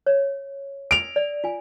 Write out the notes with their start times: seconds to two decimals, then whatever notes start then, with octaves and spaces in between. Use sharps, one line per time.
0.06 C#5
0.91 D7 F7
1.16 D5
1.44 F4 G#5